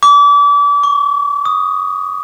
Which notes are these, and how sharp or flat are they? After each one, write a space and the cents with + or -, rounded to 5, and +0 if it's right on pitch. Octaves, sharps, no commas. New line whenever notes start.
D6 -35
C#6 +10
D#6 +0